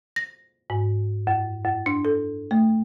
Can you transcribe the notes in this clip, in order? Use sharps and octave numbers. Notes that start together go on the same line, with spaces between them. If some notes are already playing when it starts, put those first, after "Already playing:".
A#6
G#2
F#2
F#2
D4
A4
A3